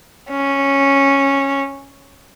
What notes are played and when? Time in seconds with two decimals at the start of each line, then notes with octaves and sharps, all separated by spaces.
0.30 C#4